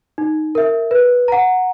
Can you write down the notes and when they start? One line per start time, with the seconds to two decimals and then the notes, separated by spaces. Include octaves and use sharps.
0.18 D#4
0.55 A#4 E5
0.91 B4
1.28 F#5 A#5